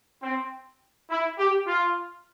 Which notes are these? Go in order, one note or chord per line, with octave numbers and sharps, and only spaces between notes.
C4
E4
G4
F4